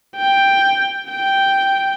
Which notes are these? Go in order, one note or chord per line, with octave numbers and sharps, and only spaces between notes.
G5
G5